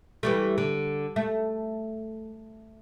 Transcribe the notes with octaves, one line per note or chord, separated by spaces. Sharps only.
E3 G3 A3
D3
A3